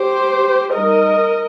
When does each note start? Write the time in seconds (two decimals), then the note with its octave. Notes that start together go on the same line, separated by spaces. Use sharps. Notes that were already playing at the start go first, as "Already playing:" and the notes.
Already playing: G4 C5
0.74 G3 D#4 A#4 D#5